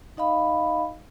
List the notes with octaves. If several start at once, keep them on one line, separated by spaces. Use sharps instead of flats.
D#4 D#5 F5 B5